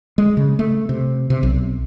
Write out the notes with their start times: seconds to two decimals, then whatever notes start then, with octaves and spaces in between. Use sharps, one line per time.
0.18 G#3
0.37 C#3
0.59 A3
0.89 C3
1.30 C3
1.43 B1